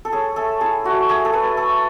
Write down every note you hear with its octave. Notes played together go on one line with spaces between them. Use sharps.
A4
C#4 G#4
A3 A4
E4 G#4
A3 F#4
A3 G#4
A4
A3 B4
A3 A4